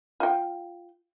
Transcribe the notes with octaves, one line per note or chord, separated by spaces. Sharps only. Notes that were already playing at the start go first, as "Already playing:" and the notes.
F4 G5